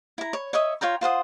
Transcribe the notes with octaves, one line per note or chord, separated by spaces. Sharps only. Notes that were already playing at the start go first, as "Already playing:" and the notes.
E4 A#5
C#5
C#5 D#5 E5 D#6
F4 C#5 G5 A#5
F4 C5 F#5 D#6